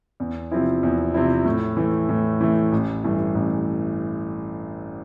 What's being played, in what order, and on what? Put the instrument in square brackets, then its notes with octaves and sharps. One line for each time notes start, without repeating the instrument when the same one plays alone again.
[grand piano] E2
C3 F3 C4 E4
E2
C3 F3 C4 E4
A2
E3 A3
A2
E3 A3
A1
G2 E3 A3
A1